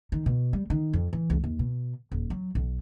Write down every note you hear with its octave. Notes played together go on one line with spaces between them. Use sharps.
D#3
B2
G3
D#3
F2
E3
C#2
D#2
B2
D#1
F#3
B1